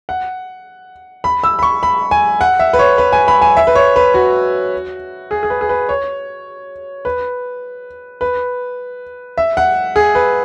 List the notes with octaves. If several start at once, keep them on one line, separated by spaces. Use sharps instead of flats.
F#5
B5
E6
B5
C#6
B5
G#5
F#5
E5
B4
C#5
B4
G#5
B5
G#5
E5
B4
C#5
B4
F#4
G#4
G#4
B4
G#4
B4
C#5
B4
B4
E5
F#5
G#4
B4